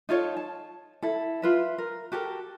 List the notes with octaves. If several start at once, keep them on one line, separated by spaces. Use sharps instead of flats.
D#4 F4 A4 C#5
A5
E4 A4
F4 B4 E5
A#4
F#4 G4 A4 A#4